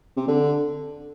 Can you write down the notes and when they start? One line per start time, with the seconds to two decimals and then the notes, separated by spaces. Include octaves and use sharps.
0.17 C3
0.28 D3